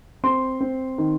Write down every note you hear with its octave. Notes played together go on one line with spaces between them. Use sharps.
C4 C6
C4
D#3